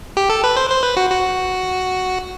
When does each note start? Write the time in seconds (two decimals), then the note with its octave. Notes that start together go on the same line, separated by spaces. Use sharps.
0.17 G4
0.30 A4
0.44 B4
0.57 C5
0.70 C5
0.83 B4
0.97 F#4
1.10 F#4